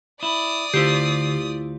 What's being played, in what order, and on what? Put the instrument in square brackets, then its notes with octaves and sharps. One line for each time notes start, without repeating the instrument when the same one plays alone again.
[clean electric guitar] E4 [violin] D5 D#6
[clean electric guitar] D2 F4 C5 [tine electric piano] D3 C7 [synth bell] E4 G4